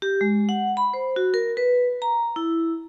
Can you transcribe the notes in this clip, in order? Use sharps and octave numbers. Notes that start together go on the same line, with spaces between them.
G4
G#3
F#5
B5
C5
F#4
A#4
B4
A#5
E4